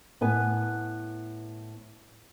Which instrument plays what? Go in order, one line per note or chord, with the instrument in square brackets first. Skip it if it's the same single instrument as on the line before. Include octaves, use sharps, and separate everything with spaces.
[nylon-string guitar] A2 B3 B4 G#5